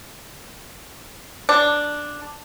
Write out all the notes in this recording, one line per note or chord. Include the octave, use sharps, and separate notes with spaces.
D4